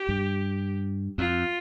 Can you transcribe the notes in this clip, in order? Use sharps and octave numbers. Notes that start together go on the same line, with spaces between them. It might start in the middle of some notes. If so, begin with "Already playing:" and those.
Already playing: G4
G2
F2 F4